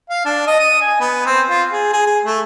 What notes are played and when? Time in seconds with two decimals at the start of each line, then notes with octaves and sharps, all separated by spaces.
0.10 F5
0.25 D4
0.47 D#5
0.59 D#6
0.81 G#5
1.00 B3
1.26 C4
1.49 F4
1.72 G#4
1.93 G#4
2.06 G#4
2.25 A3